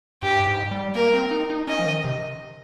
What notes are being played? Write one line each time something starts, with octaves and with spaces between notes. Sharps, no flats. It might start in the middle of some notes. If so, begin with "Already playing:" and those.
G2 G4
G#2
G3
A#3 A#4
C4
D#4
D#4
C#4 D#5
F3
D#3
C3